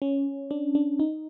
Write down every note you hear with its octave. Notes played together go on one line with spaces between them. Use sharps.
C#4
D4
D4
D#4